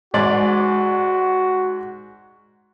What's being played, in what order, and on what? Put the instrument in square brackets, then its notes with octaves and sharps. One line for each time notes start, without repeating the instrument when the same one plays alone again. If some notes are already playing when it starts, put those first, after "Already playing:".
[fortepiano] G#2 D5 [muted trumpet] F#4